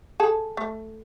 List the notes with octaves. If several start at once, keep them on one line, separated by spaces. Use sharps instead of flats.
G#4 A4
A3